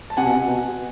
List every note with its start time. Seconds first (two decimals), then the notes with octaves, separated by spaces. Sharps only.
0.10 A5
0.17 C3 F#5 G#5
0.26 B2
0.36 C3
0.48 B2